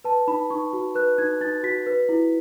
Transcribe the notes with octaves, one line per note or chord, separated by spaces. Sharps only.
B4 A5
D#4 B5
D#4 C#6
F#4
B4 F#6
D#4 G#6
D#4 A6
F#4 B6
B4
E4